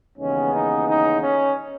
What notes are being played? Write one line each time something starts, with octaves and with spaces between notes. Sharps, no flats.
D#2 C#3 E3 G#3 B3 C#4
D#4
D#4
C#4